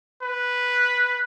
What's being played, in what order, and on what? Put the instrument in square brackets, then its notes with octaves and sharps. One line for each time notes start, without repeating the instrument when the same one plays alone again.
[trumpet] B4